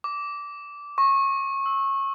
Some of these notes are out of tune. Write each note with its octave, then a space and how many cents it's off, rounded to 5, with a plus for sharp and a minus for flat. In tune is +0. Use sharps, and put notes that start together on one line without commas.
D6 -15
C#6 -25
E6 -15